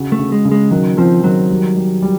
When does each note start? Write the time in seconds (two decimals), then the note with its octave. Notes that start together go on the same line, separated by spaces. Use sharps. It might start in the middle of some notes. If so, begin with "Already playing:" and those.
Already playing: C#3 F#4
0.12 A3
0.19 C#3
0.32 G#3
0.45 C#3
0.52 G#3
0.71 D#3 F#3
0.97 F3 C4
1.24 D#3 F#3
1.50 G3
1.76 G3
2.02 G3